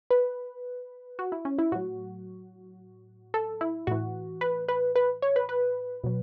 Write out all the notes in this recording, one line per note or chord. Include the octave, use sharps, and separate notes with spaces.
B4
F#4
E4
C#4
E4
A2 F#3 F#4
A4
E4
A2 E3 F#4
B4
B4
B4
C#5
B4
B4
B2 F#3